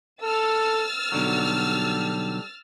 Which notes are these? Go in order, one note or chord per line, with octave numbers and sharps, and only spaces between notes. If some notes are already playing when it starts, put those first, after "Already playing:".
A4 E6 F6 A6
B1 D3 F#3 G3 A4